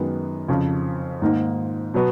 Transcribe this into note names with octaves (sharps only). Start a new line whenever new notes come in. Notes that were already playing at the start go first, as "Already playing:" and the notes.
Already playing: F#2 D#3 G#3 B3
F2 C#3 F3
G#2 D#3 A#3 D#4
B2 F#3 B3